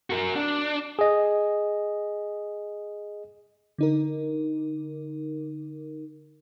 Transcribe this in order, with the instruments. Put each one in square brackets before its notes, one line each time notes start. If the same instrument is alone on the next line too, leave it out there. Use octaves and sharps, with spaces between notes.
[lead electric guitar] F#4 A#4
D4
[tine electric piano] G#4 D#5
[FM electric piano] D3 D#4 A#4